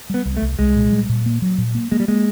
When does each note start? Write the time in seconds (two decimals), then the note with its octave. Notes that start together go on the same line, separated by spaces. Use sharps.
0.10 G3 B3
0.25 C2
0.37 A3
0.42 C2
0.59 C2 G#3
0.75 A#2
0.92 G3
1.09 A#2
1.26 A#3
1.42 F#3
1.58 A#2
1.75 A#3
1.92 G#3 A#3
2.00 G3
2.08 G#3 A#3